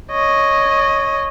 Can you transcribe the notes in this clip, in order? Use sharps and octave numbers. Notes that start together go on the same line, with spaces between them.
C#5 D#5